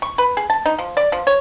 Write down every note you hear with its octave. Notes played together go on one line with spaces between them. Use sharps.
C#6
B4
G#4
A5
D#4
F3
D5
F3
C#5